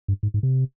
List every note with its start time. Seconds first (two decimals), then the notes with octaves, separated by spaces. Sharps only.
0.08 G2
0.23 G#2
0.34 G#2
0.43 C3